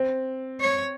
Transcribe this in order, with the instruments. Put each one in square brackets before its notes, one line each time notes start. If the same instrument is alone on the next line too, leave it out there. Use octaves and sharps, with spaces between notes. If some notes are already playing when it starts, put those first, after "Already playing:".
Already playing: [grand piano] C4
[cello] C#5